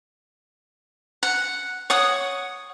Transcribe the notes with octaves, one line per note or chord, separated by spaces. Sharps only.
F#5
C#5 F#5 D#6